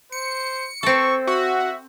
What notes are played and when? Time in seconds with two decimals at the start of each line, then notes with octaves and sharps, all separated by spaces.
0.12 C5 C#7
0.83 C4 A4 C#6
1.27 F#4 E5